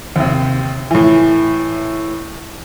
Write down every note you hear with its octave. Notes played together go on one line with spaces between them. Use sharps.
D#2 C3
A2 E3